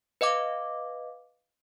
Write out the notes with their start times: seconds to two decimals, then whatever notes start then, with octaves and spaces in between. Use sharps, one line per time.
0.21 B4 D#5 F5 D6